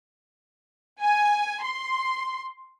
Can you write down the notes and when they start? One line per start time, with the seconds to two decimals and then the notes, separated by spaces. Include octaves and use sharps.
1.02 G#5
1.63 C6